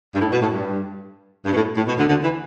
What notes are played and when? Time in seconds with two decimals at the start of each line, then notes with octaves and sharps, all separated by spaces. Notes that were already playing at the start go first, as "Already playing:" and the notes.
0.13 G2
0.20 A2
0.31 B2
0.41 A2
0.52 G2
1.45 G2
1.51 B2
1.56 A2
1.77 A2
1.87 B2
1.98 D2 D3
2.08 D2 D3
2.23 E3